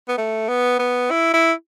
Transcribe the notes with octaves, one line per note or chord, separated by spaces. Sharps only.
B3
A3
B3
B3
E4
E4